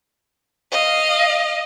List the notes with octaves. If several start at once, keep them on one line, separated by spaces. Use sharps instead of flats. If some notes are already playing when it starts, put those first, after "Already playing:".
D#5 F5